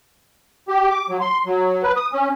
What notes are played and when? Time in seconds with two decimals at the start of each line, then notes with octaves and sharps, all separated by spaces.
0.68 G4
0.90 D6
1.09 F#3
1.21 C6
1.46 F#3
1.83 B4
1.96 D#6
2.13 C#4